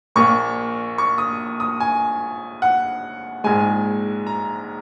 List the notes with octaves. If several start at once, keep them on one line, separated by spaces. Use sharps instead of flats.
A#1 A#2 A#3 C#6
C#6
D#6
D#6
G#5
F#5
A#1 G#2 G#3 G#5
A#5